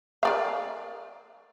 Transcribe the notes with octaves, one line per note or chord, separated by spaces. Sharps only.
A#4 D5 F5